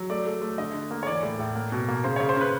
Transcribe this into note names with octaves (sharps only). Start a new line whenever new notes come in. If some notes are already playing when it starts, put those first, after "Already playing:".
Already playing: F#3
A3 D5
A3
A3
D3 D#5
D3
A#3
C#5
E3 D5
A2
A2
A#3
B2
A#3
C#3 C5
C#3 C#5
C5
C#3 B4